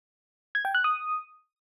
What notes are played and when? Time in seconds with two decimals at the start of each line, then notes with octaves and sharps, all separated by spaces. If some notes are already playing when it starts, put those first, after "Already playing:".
0.55 G#6
0.65 G5
0.75 F#6
0.84 D#6